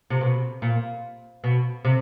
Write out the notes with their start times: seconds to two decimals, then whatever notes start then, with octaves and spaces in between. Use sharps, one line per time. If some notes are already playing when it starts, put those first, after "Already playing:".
0.10 C3
0.21 B2
0.62 A#2
1.44 B2
1.85 C3